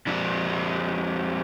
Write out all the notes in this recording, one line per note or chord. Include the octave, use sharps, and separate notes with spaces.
F2 D4